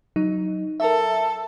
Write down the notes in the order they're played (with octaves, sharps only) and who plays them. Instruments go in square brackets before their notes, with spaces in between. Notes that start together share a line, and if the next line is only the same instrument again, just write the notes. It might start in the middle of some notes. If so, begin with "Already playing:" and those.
[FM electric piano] F#3 D#4
[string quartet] A4 [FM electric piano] A#4 E5